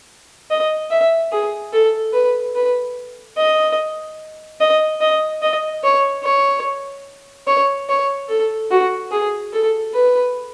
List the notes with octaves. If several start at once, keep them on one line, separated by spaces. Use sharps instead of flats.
D#5
E5
G#4
A4
B4
B4
D#5
D#5
D#5
D#5
C#5
C#5
C#5
C#5
A4
F#4
G#4
A4
B4